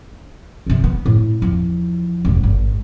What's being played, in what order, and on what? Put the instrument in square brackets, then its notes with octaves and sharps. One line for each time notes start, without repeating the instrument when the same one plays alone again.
[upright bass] E2 C3
B3
A2
E2 F3
E1 G#2
G#1